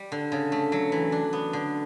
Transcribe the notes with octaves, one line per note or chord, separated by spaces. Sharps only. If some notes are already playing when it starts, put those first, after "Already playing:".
Already playing: G3
D3
C#3
A3
F#3
E3
D4
B3
D3